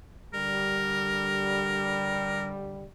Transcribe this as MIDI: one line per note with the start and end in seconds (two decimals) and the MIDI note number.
0.34 2.84 50
0.34 2.84 55
0.34 2.47 70